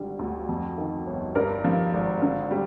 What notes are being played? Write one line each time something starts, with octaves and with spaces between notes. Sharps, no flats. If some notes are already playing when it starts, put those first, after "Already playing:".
Already playing: G#1 D3 G3
D2
F2
D#3
G1
G2 A#4 D5
F3
G#1
D3
G3